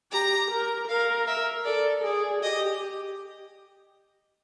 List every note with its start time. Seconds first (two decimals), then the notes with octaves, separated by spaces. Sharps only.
0.12 G4 A#5
0.51 A#4
0.88 A#4 F5
1.27 E5
1.65 A4 D5
2.04 G#4 D5
2.42 G4 D#5